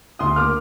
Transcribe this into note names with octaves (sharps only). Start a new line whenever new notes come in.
D2 C6 D#6
A#3 D6 F6